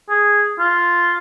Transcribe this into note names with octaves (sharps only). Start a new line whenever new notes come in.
G#4
F4